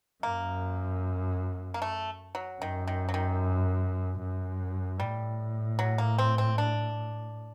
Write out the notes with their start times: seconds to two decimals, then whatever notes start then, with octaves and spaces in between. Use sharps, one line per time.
0.23 F#2 A#3
1.74 A#3
1.82 A3
2.35 F#3
2.62 F#2 D#3
2.88 D#3
3.09 F#3
3.14 D#3
4.20 F#2
5.00 A2 G3
5.79 F#3
5.98 A#3
6.18 C4
6.38 C4
6.58 D4